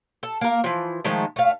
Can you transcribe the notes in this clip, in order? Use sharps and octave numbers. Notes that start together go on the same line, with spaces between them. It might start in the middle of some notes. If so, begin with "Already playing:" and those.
A4
A#3 A#4
E3 F3
D#3 F3 G#3 A3
A3 F5